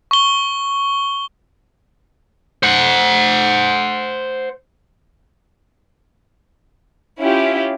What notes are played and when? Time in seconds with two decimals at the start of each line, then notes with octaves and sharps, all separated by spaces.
0.11 C#6 G7
2.63 C5 F#5
7.18 C#4 E4 F4 G4